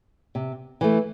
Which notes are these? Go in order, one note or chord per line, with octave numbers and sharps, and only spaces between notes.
C3
E3 A3